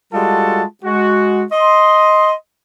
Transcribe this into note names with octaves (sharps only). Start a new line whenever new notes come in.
G3 G#3 F4 F#4 A4 A5
G#3 F#4
D#5 C6